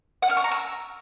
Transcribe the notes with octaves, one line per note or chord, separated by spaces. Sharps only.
F#5
F6
C#6
A#5
E6